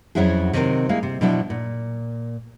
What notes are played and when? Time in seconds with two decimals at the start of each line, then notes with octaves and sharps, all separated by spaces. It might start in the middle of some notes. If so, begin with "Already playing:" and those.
0.15 F2 F#3 C#4 E4 F#4 G#4
0.53 C3 D#3 F#3 G3 C4 A#4
0.89 G#3 A#3 E4 F5
1.03 C3
1.21 B2 F3 F#3 D4 E4
1.50 A#2